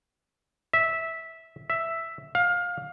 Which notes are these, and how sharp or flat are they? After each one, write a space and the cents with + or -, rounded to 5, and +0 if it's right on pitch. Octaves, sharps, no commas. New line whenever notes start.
E5 -10
E5 +5
F5 +20